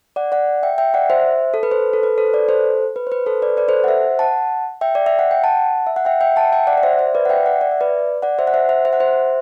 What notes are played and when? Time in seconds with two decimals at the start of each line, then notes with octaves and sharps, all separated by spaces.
0.16 D5 F#5
0.32 D5 F#5
0.63 E5 G5
0.78 E5 G5
0.94 D5 F#5
1.10 C5 E5
1.54 A4
1.63 B4
1.71 A4 C5
1.93 A4
2.03 B4
2.18 A4 C5
2.34 B4 D5
2.49 A4 C5
2.96 B4
3.07 C5
3.12 B4
3.26 A4 C5
3.42 B4 D5
3.57 B4 D5
3.68 A4 C5
3.84 F#5
3.88 C5 E5
4.19 F#5 A5
4.81 E5 G5
4.95 D5
5.06 E5
5.19 F#5
5.31 G5
5.44 F#5 A5
5.87 E5
5.96 F#5
6.05 E5 G5
6.21 E5 G5
6.36 F#5 A5
6.52 E5 G5
6.67 D5 F#5
6.78 D5
6.83 C5 E5
6.98 C5 E5
7.15 B4 D5
7.25 F#5
7.29 E5 G5
7.46 D5 F#5
7.61 D5
7.71 E5
7.81 B4 D5
8.22 D5 F#5
8.38 C5 E5
8.47 F#5
8.54 C5 E5
8.69 C5 E5
8.85 C5 E5
8.93 F#5
9.00 C5 E5